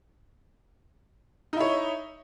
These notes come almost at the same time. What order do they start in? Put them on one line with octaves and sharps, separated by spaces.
D#4 E4 C#5